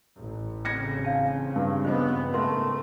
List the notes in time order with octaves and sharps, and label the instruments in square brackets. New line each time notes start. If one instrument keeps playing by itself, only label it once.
[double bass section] A1
[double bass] C#3 C4 [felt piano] G#6 A#6 C#7
[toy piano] D4 F5 A5
[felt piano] G2
[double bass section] B3 [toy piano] F4 C5 D#5
[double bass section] G#2 A3 [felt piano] A#4 [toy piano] E5 B5 C6